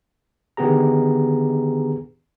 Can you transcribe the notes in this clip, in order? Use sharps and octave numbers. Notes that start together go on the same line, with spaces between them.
D3 D#3 B3 G4 G#4 A#5